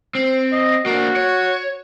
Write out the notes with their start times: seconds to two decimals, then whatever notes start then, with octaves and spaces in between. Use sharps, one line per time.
0.15 C4
0.52 D#5
0.86 A#3 D4 F#4
1.16 C#5